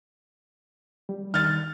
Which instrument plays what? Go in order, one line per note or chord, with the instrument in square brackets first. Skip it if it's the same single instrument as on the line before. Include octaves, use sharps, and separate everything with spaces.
[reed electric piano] G3
[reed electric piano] D#3 [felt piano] F6 A6